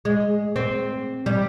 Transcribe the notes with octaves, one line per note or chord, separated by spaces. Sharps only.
G#3
C4
G3